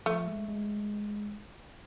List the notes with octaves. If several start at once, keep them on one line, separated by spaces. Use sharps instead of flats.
F3 A3
G#3
G#3